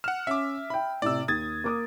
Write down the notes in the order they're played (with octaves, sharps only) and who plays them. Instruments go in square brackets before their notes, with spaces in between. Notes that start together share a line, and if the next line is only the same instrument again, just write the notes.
[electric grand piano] F#5 F6 [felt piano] E7
[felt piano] C#4 [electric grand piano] E5 D6
[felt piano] E5 G5 [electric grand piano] B5
[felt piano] A2 C3 [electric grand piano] D5 E6
[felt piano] D#2 [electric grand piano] D#6 G#6 A6
[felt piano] A#3 D6 D#6